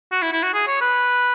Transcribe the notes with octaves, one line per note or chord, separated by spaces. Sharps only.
F#4
E4
E4
F#4
G#4
C#5
B4